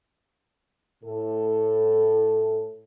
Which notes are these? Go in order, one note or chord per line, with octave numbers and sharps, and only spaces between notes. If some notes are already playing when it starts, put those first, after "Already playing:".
A2 A4